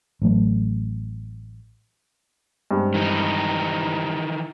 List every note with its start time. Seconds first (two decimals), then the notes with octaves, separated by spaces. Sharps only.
0.22 A1 F#3 A3
2.71 G2 G#3 C4
2.94 D#3 E3 D#4